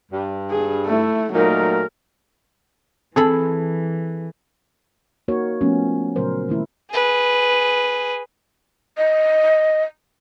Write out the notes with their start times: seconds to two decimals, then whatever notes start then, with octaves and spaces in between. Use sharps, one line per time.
0.12 G2
0.50 G#4
0.86 A3 E4
1.34 A#2 F#3 A3 D#4 A#4
3.16 E3 C4 G#4 A4 B5
5.28 A#3 D#4 F#4 A#4 C#5
5.61 F3 A3 B3 C#4
6.16 A#2 C#3 F#3 A#4 C5
6.49 D#3 A3 E4
6.91 G#4 B4
8.98 D#5